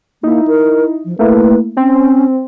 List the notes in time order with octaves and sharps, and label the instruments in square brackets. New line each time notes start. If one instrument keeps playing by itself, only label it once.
[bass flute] A#3 [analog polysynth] D#4 E4
[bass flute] A#4
F3
[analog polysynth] A3 A#3 E4 [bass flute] B4
[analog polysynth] C4 [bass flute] C#4